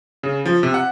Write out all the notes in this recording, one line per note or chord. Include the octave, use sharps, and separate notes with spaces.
C#3
F3
C3
F#5